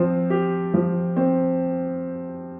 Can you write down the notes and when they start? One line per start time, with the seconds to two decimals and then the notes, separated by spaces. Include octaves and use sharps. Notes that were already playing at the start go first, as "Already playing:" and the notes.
Already playing: F3 C4
0.30 G4
0.74 F3
1.16 C4